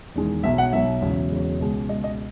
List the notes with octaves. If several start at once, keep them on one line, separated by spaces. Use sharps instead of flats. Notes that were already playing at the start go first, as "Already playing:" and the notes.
E1 E2 D#3 G#3
B1 B2 F#3 E5
F#5
B1 B2 F#3 E5
E1 E2 C#3 F#3
E1 E2 C#3 F#3
C#2 B2 G#3
C#2 B2 G#3 D#5
D#5